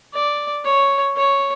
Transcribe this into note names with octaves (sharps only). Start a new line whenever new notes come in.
D5
C#5
C#5